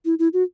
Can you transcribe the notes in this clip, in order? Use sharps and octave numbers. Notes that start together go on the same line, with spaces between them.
E4
E4
F#4